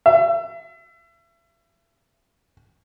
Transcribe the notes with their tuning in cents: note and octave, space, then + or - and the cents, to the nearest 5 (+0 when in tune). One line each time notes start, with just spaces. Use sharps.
E5 +35